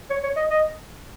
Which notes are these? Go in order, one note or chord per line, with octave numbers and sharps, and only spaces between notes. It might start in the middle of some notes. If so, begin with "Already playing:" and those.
C#5
C#5
D#5
D#5